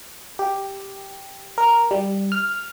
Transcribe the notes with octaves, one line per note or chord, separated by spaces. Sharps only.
G4
A#4
G3
F6